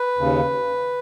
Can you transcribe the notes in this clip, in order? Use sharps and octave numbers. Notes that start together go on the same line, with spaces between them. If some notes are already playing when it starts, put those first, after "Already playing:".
Already playing: B4
D#2 C#3